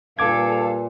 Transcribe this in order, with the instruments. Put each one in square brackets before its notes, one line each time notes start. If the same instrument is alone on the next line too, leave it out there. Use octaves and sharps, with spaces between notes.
[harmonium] A#2 [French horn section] G3 B4 [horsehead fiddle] A4 F5 [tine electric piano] D6 G#6